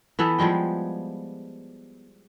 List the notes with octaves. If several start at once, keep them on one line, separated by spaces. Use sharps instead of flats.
E3 B3 E4 A4
F3 G3 G#3 G5